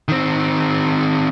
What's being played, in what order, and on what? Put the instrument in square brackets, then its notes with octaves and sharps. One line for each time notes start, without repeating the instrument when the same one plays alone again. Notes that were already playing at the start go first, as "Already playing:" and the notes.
[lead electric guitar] D#3 C4